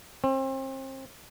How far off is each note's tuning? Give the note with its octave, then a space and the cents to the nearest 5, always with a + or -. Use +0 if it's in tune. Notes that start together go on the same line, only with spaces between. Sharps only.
C4 +35